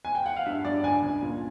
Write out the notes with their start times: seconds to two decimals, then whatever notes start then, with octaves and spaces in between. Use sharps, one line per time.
0.05 G#5
0.15 G5
0.26 F#5
0.36 F5
0.46 G2 E5
0.65 G2 D5
0.84 C#2 G#5
1.03 C#2
1.21 A#2